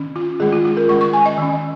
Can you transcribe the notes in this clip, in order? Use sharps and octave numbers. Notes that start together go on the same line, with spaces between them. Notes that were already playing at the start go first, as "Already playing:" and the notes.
Already playing: D#3 C#4
F4
D#3 G#3 C#4 G#4
F4
F4
A#4
D#3 G#3 C#4 C#6
C#6
G#5
D#5
D#3 C#4